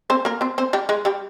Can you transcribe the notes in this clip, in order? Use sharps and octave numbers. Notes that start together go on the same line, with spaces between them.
C4 C5
A#3 A#4
C4 C5
C4 C5
G3 G4
G#3 G#4
G3 G4